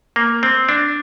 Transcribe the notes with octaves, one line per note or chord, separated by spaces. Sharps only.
A#3
C4
D4